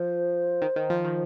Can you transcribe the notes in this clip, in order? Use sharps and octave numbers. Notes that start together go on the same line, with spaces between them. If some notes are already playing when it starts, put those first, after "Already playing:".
Already playing: F3 C5
D#3
D#3
F3
D#3